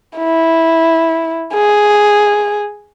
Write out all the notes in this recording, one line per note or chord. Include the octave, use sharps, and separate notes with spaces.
E4
G#4